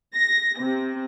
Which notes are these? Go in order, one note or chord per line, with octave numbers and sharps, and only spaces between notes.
A#6
C3